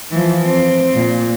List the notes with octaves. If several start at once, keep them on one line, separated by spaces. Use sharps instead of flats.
E3 F3
C4
A#2